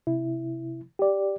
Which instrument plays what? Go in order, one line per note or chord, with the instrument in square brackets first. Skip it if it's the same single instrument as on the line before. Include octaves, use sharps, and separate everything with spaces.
[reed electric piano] C3 E4
G4 D5